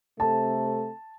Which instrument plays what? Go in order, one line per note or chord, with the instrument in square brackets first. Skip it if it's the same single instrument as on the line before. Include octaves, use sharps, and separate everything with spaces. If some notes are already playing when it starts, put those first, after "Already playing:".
[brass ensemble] C3 A3 C4 A4 [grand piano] A5